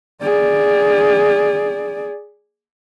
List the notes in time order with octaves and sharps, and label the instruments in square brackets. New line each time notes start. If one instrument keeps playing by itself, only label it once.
[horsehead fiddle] G#4 D5